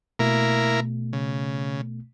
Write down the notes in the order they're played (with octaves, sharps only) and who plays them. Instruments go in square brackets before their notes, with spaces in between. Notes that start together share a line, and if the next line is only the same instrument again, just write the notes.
[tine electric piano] B2 A3 [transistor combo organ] A#3 E4 A#4
[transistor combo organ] C#3